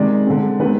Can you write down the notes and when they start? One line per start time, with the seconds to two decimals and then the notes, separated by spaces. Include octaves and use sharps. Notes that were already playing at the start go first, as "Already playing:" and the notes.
Already playing: C3 D#3 G#3 D5
0.27 D3 G#3 C4
0.59 D#3 G#3 C4 B4